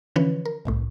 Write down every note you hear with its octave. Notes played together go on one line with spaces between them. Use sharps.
D3 E3 F3 C#4 B4 C#5
A#4
G1 C2 A2